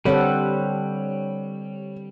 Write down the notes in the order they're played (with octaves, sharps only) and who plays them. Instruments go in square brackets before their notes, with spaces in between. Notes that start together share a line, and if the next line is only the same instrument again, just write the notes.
[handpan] D3 C4 A4 [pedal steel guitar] G3 [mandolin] G4 B4 F#5 [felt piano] C#5